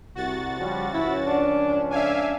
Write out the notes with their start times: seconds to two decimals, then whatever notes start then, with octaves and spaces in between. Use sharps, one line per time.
0.15 C2 F#4 A6
0.59 C#3 F3 G3
0.94 C#2 F3 C#4 E4
1.26 D4
1.91 D4 E5 F5 G#5